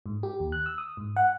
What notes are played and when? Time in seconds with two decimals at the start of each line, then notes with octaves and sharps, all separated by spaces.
0.06 G#2
0.23 G4
0.40 D#2
0.52 F#6
0.66 E6
0.78 D#6
0.97 G#2
1.16 F#5